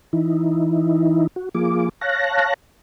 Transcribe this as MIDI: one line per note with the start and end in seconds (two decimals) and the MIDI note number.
0.13 1.27 52
0.13 1.27 63
0.13 1.27 64
1.36 1.49 66
1.55 1.89 53
1.55 1.89 58
1.55 1.89 65
1.55 1.89 68
1.55 1.89 86
2.01 2.54 73
2.01 2.54 77
2.01 2.54 81
2.01 2.54 90
2.01 2.54 94